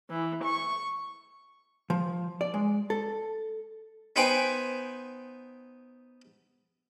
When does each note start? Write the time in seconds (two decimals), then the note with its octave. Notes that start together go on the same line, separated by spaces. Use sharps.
0.10 E3
0.44 C#6
1.90 F3
2.41 D5
2.54 G#3
2.90 A4
4.16 B3 D#4 B4 C5 G5 G#5